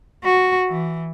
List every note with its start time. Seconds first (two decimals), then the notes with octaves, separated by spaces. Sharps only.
0.24 F#4
0.68 E3